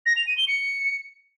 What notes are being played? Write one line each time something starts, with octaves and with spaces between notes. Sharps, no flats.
A#6
F7
D#7
G7
C#7